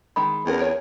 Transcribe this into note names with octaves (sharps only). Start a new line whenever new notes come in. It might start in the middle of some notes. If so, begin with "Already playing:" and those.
D#3 G#3 B5
E2 C4 C#4 A#4
A#4 C#5 G#5